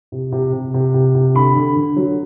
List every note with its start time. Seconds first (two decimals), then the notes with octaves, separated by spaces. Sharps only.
0.12 C3
0.32 C3
0.53 C3
0.74 C3
0.94 C3
1.15 C3
1.35 D3 B5
1.55 D3
1.76 D3
1.96 F#3